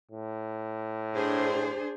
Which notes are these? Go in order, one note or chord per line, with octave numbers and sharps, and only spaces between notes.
A2
D4 G#4 C5